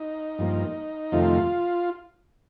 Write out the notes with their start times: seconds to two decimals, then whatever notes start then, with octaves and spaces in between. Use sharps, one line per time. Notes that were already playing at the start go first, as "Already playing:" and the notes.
Already playing: D#4
0.38 G2 F3 A#3
1.12 F2 C3 D#3 A3 F4